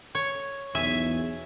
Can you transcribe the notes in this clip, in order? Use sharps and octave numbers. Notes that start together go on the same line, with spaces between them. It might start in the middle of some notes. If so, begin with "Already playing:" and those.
C#5
B1 E2 E5 G#5